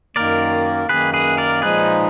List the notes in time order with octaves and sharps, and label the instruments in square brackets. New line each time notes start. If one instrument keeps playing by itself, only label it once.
[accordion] F#2 D#3 A#3 [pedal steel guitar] A#4 D5
[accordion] F#2 D#3 A#3 [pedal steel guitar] G#4 B4
[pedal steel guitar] G#4 B4
A#4 D5
[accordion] A#2 F3 G#3 D#4 [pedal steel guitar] G#4 B4